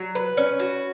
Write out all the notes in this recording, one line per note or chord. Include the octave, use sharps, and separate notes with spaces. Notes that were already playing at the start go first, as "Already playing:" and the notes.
Already playing: F#3
B4
C#4
F#4